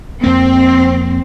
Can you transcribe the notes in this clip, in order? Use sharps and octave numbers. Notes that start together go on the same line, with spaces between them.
F2 A#3 C4